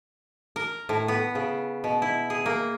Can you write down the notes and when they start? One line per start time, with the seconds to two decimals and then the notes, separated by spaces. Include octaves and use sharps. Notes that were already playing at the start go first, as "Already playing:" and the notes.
0.56 A#4
0.89 A2
1.08 B3
1.35 C#3
1.84 B2
2.02 E4
2.30 G#4
2.46 A#3